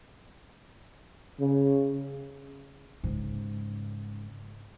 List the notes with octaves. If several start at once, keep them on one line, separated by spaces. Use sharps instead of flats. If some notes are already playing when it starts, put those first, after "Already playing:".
C#3
G#2 C#3